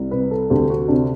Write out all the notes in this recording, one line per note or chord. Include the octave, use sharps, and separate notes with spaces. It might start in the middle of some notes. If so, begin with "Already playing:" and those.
Already playing: C2
C3 B4
A4
D2 G4
F#4
C3 D4